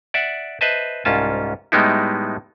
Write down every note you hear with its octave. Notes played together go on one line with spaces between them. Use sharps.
D5 E5 F#5
B4 C5 D#5 E5 A5
C2 G#2 C#4 F4 A5
A2 G3 G#3 B3 D#4 E4